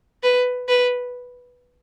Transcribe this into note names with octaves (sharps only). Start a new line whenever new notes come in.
B4
B4